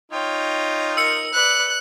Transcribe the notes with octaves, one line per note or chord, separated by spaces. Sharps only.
D#4 F4 C#5 G5
A#4 E6 C#7
B4 D5 F#6